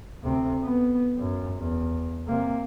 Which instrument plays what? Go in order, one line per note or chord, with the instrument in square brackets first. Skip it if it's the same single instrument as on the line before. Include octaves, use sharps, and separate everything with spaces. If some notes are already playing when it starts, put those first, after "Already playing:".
[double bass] D2 C3
B3
F#2
E2
C3 A#3